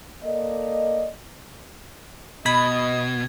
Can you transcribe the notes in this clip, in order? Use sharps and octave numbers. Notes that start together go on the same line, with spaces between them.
A#3 A4 D5 D#5
B2 D#5 B5 G#6